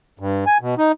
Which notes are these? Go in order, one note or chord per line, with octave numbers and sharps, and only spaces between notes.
G2
G#5
B2
D#4